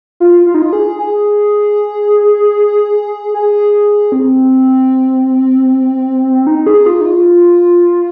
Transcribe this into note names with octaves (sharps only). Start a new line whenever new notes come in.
F4
F4
D#4
F4
G#4
G#4
G#4
C4
D#4
G#4
F4
D#4
F4